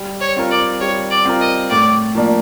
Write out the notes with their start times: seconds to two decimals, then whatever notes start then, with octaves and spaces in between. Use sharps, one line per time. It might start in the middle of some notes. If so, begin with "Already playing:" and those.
Already playing: G3
0.21 C#5
0.36 C4 F4 A#4
0.51 D5
0.81 G3 C#5
1.10 D5
1.25 C4 F4 A#4
1.41 D#5
1.70 A2 D5
2.15 F3 A#3 D4